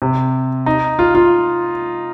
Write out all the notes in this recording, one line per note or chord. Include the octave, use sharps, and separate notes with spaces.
C3
D#4
F4
F4